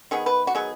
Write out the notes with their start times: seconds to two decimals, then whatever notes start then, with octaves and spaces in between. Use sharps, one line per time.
0.11 D#3 B3 G#4
0.26 B4
0.47 F#4
0.55 D#3 F#3 B3 G#4